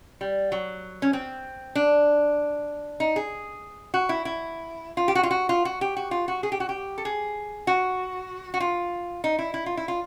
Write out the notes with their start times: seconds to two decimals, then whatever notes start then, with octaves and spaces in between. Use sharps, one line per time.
0.21 G3
0.52 F#3
1.02 C#4
1.13 C4
1.75 D4
3.00 D#4
3.16 G#4
3.94 F#4
4.09 E4
4.25 E4
4.97 F4
5.08 G4
5.15 F#4
5.23 F4
5.31 F#4
5.49 F4
5.65 F#4
5.81 G4
5.97 F#4
6.11 F4
6.28 F#4
6.43 G#4
6.52 G4
6.60 F#4
6.69 G4
6.98 A4
7.05 G#4
7.67 F#4
8.54 F#4
8.60 F4
9.24 D#4
9.39 E4
9.54 E4
9.66 F4
9.77 E4
9.88 F4